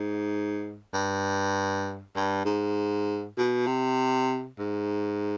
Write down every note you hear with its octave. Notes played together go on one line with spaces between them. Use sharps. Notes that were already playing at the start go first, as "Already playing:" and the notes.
Already playing: G#2
G2
G2
G#2
B2
C3
G#2